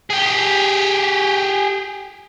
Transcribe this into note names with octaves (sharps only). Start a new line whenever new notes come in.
G4 G#4